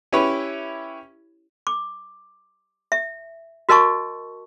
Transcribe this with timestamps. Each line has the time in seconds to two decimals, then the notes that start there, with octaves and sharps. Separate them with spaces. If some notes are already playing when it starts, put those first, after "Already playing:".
0.13 C#4 E4 G4 B4 C#5
1.67 D6
2.92 E5
3.69 F#4 A#4 D#5 A5 C#6